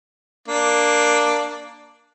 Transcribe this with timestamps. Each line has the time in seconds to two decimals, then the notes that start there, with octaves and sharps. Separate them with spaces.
0.48 A#3 D4